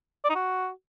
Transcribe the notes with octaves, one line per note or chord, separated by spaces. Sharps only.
D5
D#4
F#4